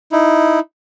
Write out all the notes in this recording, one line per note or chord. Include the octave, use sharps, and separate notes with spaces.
D#4 E4